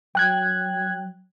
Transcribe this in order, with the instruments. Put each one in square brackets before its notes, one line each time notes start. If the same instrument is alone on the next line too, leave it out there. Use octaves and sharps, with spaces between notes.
[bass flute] F#3 [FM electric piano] G5 F#6 G#6